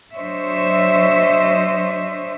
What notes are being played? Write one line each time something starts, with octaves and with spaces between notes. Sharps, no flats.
F#3 D4 C5 C#5 D#5 E5